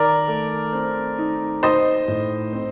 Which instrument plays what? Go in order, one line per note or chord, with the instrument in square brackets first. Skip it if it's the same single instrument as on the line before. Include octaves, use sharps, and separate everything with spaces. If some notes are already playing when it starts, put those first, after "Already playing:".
Already playing: [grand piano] D#3 [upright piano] A#4 D5
[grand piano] A3
C4
D#4
[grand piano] D#4 [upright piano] C5 D#5
[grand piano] A2
C4